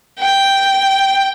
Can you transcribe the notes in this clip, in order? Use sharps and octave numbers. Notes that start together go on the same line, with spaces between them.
G5